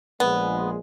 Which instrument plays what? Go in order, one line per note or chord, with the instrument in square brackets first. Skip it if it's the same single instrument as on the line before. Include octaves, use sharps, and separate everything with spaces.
[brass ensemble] A#1 G#3 [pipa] B3